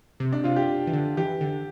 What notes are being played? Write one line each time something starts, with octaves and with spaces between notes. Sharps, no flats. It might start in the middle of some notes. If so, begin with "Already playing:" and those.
C3
D4
C3 F4
G4
E3
D3
E3 G4
D3